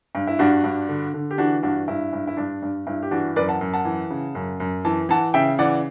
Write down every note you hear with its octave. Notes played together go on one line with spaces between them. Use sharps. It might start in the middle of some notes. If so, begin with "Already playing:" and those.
G2
E4
G2 D4 F#4
G2
D3
D3
G4
E3 D4 F#4
G2 D4 F#4
G2 E4
G2
E4
G2 D4
G2
G2 E4
G4
E3 D4 F#4
F#2 B4 D5
F#5 A5
F#2
F#5 A5
E3
C#3
F#2
F#2
E3 A5
E3 F#5 A5
C#3 E5 G5
E3 D5 F#5